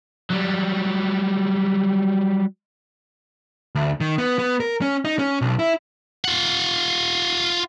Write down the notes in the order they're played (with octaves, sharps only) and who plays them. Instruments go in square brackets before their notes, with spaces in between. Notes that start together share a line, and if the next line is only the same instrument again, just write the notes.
[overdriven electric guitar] F#3 G3
[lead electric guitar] D2
D#3
B3
B3
A#4
C#4
D#4
C#4
B1
E4
[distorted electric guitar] F4 F#5